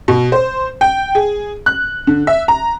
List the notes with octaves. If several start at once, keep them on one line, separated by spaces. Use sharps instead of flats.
B2
C5
G5
G#4
F#6
D3
E5
A#5